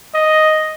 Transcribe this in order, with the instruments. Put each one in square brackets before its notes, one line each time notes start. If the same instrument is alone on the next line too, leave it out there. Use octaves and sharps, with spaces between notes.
[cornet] D#5